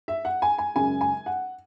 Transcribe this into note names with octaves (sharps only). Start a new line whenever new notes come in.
E5
F#5
G#5
G#5
F#2 C#3 G#3 C#4 G#5
G#5
F#5